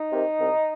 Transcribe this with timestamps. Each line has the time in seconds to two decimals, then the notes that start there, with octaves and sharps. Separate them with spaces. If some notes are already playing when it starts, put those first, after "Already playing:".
Already playing: D#4
0.11 C3 D#3
0.39 C2